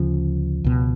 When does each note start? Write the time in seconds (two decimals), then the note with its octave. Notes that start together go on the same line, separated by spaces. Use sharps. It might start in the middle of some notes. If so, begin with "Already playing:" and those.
Already playing: D2 C#3 F3
0.64 C#2 B2